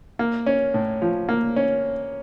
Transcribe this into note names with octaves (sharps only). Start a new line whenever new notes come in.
A#3
C#4
A2
F3
A#3
C#4